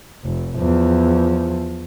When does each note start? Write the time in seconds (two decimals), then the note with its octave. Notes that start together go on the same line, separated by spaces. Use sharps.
0.24 F1
0.56 E2 F3